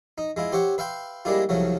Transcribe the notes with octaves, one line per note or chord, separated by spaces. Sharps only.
D#4
G#3 E4 F4
G4 C5 C#5 E5 F#5
B4 E5 F5 G5 C6
G3 G#3 A#3 D4 E4 F4
C2 C#3 F3 F#3 A3